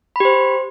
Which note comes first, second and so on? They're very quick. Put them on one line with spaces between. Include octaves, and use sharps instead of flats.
B5 G4 C5